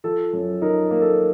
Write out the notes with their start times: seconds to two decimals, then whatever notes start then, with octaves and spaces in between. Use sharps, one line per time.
0.04 F3 A4
0.33 F#2
0.62 D#4 A#4
0.91 A#3
1.02 A4